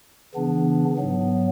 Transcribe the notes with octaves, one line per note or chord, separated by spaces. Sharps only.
C#3 E3 B3 D4
G#2 F#3 B3